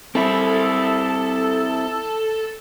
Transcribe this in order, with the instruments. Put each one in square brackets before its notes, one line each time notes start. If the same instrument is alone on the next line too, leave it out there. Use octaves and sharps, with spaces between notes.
[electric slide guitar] C4 E4 [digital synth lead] A4